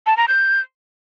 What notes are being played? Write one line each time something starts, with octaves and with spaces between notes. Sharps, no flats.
A5
A#5
G6